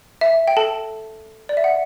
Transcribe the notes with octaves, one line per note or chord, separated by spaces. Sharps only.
E5
G5
A4 A5
D5
E5
F#5